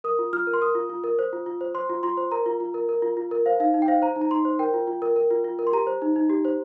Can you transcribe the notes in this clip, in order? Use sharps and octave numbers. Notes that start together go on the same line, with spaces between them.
A#4 D#6
F4
F4 F6
A#4
C6
A#4 D#6
F4
F4
A#4
C5
F4
F4
C5
C5 C6
F4
F4 C6
C5
A#4 A#5
F4
F4
A#4
A#4
F4
F4
A#4
C5 F5
D#4 F5
D#4
G5
C5 F5
C5 A#5
D#4
A#5
D#4 C6
C5
A#4 G5
F4
F4
A#4
A#4
F4
F4
A#4
C6
G4 A#5
C5
D#4
D#4
G4
C5